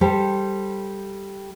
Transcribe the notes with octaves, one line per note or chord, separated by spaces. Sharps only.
G3 G4 A4 C5